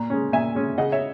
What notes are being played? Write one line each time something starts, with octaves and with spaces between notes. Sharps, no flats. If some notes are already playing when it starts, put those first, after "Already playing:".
Already playing: A#2 A#5
G#3 C#4
A#2 E5 G#5
G#3 C#4
C#3 D#5 F#5
C#5 E5